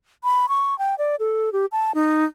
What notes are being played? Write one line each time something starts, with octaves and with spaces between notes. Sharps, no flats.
B5
C#6
G5
D5
A4
G4
A5
D#4